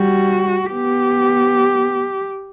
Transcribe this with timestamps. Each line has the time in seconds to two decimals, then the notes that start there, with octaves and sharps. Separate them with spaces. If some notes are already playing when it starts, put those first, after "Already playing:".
Already playing: G3 F#4
0.73 B3 G4